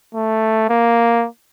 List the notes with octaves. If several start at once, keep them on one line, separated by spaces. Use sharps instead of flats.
A3
A#3